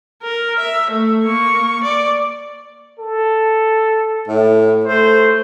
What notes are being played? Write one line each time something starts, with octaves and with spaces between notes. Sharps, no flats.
A#4
E5
A3
A#3 C#6
D5
A4
A2
A3 C5